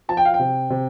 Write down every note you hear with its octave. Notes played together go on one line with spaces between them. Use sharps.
F3 A5
G5
F5
G5
C3
C3